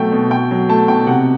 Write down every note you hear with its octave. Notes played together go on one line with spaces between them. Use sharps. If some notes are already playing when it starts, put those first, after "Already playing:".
Already playing: B2 F#3 A3 G5
B2
B2 G5
F#3
A3 A5
B2 G5
C3 F#5